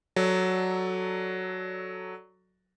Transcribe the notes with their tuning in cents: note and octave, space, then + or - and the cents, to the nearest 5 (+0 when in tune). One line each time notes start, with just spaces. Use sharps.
F#3 +0 A4 +0 D5 +0